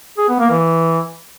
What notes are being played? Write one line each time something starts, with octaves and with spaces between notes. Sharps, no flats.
G#4
B3
A#3
E3